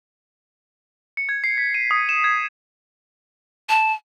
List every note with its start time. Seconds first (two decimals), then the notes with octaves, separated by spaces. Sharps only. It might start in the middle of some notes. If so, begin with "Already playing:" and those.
1.17 C#7
1.29 G#6
1.44 C7
1.58 B6
1.74 D#7
1.91 D#6
2.09 E7
2.24 G#6
3.69 A5